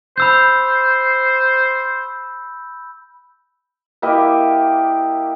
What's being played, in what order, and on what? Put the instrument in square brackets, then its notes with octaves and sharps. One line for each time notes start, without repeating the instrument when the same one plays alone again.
[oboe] C5 [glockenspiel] B5 E6 G6
[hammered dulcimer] A#3 E4 G4 D#5